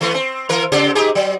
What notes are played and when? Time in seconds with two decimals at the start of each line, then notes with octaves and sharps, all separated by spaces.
0.01 E3 A3 B3
0.14 C4
0.49 E3 A#4
0.72 C#3 C4 G4
0.95 D#4 G4 G#4
1.15 F#3